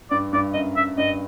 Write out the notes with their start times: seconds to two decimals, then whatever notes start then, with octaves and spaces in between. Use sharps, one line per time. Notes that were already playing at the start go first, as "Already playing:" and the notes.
0.11 G2 D5
0.33 G2 D5
0.54 F#2 D#5
0.76 F#2 E5
0.98 G2 D#5